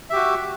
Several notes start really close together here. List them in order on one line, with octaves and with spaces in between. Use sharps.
E5 G4 F#4